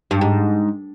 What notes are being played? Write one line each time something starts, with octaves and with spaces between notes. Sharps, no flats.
G2
G#2